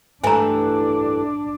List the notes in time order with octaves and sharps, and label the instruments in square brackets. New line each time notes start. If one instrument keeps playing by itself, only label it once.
[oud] G2 E3 A3 [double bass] D4 [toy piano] G#5 A#5